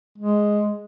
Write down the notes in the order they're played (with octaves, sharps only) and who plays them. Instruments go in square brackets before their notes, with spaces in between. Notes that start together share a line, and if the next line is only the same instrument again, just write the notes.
[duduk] G#3